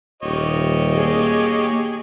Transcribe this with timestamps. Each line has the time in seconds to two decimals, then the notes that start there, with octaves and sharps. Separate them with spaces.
0.23 D#1 G4 C#5 D#5
0.96 A#3 G#4